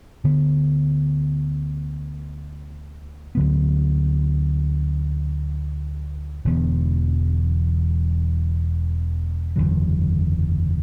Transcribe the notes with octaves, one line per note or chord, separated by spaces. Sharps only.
D2 D3 B3
D2 D3 F#3 B3
E1 E2 D3 B3
F#1 E2 D3 F#3